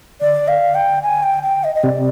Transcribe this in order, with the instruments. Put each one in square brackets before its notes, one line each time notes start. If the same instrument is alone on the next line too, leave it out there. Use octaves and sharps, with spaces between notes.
[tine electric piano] D3 [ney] D5
[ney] F5
G5
G#5
G5
G5
D#5
D#5
[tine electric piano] C3 [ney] D5